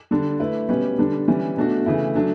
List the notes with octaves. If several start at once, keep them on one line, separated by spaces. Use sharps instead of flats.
D3 G3 D4
A3 E4 B4
B2 G3 C#4 G4 B4
D3 G3 D4
E3 G3 C#4
B2 A3 D4 F#4
C#3 E3 A3 E4
F#3 A3 D4